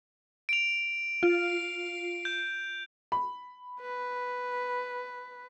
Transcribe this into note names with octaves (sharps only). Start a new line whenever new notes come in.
D7 F7
F4
G6
B5
B4